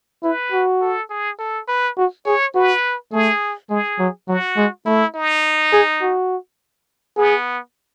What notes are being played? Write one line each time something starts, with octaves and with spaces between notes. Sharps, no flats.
E4 B4
F#4
A4
G#4
A4
B4
F#4
G#4 C#5
F#4 B4
A3 G#4
G#3 G#4
F#3
F#3 F#4
G#3
A3 E4
D#4
G#4
F#4
B3 G#4